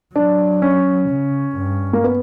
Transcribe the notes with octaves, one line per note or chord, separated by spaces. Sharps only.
F#3 D4
C#4
C#3
G2
A#3
B3